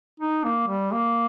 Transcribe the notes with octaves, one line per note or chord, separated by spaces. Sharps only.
D#4
A#3
G3
A#3